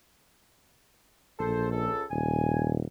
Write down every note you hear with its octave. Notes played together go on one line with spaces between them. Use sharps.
A#1 A4 C5
C#2 A4
D#1 G#5